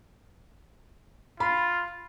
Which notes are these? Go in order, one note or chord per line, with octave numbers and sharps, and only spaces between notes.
F4 B5